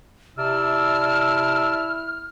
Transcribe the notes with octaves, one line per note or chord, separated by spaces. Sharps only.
C3 E4 D5 A5 E6 F6